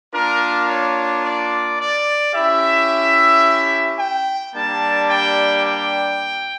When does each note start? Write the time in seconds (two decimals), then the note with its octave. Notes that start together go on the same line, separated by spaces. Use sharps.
0.14 A#3 D4 F4 A#4
0.69 C#5
1.24 D5
1.79 D5
2.34 C#4 E4 G4 E5
3.99 G5
4.54 G3 A#3 D4 G4 A5
5.09 G5
5.65 G5